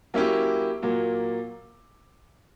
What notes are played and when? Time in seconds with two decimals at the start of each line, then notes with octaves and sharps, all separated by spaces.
0.14 F#3 A#3 C#4 E4 G4
0.82 A#2 F#3 A#3